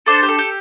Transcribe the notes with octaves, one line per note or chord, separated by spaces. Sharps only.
D4 A4 C5
G4
A4
G4